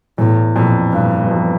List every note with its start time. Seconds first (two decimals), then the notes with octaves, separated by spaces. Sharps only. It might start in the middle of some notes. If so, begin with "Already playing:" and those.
0.18 E2 A2
0.56 F2 A#2
0.93 G2 A#2
1.23 E2
1.31 F2